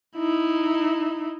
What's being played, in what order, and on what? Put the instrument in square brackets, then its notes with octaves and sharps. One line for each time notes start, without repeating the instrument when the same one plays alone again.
[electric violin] D#4 E4